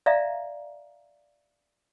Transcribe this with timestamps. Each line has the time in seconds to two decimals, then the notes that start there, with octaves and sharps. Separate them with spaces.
0.06 D5 E5 F5 A#5